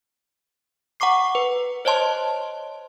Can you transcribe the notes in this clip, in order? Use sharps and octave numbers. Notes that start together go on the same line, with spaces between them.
F#5 A#5 C#6 D6 C7
B4
C5 C#5 D#5 A5 C6